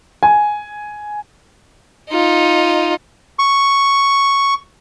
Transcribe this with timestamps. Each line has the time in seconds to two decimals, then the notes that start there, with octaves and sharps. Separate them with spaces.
0.23 G#5
2.10 D#4 F4
3.39 C#6